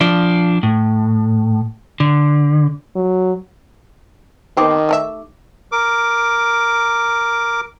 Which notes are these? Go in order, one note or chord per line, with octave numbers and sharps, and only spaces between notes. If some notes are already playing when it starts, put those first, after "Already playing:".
F3 D4
A2
D3
F#3
D#3 B3 C4 D#4 G4 D6
A3 A#4 E5
A#4 D6